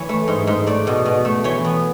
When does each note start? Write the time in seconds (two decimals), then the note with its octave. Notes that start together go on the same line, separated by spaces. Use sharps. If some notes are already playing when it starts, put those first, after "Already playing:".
Already playing: E3 C#5
0.09 A3
0.28 G#2
0.47 G#2
0.67 A3 D5
0.87 B2
1.05 B2
1.25 A3
1.44 E3 C#5
1.64 B3